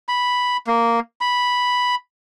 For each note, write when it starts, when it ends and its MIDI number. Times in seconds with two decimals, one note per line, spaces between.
0.09 0.57 83
0.67 1.00 58
1.21 1.95 83